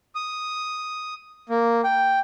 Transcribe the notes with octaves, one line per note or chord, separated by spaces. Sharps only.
D#6
A#3
G5